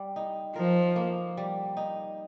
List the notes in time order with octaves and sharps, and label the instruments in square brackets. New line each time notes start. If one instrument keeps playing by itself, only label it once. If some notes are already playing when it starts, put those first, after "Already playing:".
Already playing: [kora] G3
D#4
[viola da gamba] F3 [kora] A#4
[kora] A#3
G3
D#4